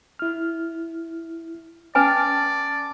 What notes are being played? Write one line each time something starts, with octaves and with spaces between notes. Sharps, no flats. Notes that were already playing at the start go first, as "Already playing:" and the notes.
E4 F6
C#4 B4 D5 G#5 A5 D6 F6